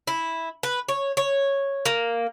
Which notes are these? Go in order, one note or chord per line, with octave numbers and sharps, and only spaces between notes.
E4
B4
C#5
C#5
A#3